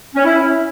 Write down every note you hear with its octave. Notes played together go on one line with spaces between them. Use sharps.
C#4
E4